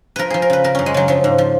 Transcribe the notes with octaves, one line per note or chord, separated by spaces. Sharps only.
F3 A#4 B4
F3 G#4
A#4
C#3 B4
C#3 A#4
F#2 C#4
G#3
C#3 F#3
F3 F#3
G#2
F3